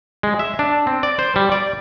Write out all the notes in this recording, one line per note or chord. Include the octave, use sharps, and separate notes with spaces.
G#3
E5
D4
C4
D5
C5
G3
D5